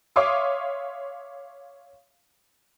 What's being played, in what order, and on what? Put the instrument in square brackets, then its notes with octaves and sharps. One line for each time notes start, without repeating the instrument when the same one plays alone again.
[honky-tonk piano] C#5 E5 F5 C6 D6 D#6